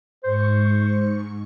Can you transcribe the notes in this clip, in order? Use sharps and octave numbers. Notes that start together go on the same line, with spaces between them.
G#2 C5 C#6